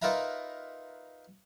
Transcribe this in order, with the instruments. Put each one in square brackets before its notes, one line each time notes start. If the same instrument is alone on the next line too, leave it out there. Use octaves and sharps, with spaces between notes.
[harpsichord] D#4 F4 A#4 B4 E5 A#5